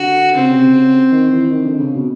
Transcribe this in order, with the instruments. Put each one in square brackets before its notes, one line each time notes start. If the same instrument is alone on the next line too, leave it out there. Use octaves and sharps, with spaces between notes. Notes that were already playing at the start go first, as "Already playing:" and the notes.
Already playing: [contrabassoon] D3 [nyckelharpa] F#4
[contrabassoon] C#3 [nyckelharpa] C4
[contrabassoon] C#3
C3
C#3
D#3
E3
D#3
D3
C#3
B2